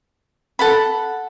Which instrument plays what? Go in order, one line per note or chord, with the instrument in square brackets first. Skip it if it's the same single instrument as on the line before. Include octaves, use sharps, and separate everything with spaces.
[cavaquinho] A4 F#5 B5